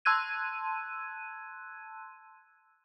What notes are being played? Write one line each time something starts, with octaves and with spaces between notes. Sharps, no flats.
A5 C6 E6 F#6 G#6 D#7